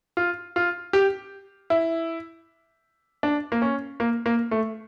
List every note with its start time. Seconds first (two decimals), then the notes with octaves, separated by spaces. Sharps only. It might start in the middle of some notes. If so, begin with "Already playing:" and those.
0.17 F4
0.56 F4
0.93 G4
1.70 E4
3.23 D4
3.52 A#3
3.62 C#4
4.00 A#3
4.26 A#3
4.51 A3